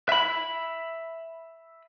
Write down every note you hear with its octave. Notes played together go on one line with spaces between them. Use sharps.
E5 B5